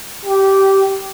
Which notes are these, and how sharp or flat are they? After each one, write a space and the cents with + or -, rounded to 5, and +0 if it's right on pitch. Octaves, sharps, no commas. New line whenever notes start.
G4 -15